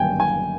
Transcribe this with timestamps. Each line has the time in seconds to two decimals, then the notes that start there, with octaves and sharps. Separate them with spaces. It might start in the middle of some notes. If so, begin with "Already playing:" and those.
Already playing: G1 F#2 D#3 G3 A#3 G5 G#5
0.20 G#5